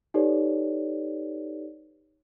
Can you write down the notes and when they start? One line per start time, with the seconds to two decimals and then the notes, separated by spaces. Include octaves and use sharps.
0.14 D#4 G4 A4 B4 C#5 D5